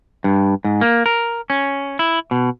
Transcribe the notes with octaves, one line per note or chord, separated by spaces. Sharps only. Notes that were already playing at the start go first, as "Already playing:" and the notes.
G2
G#2
A#3
A#4
C#4
E4
B2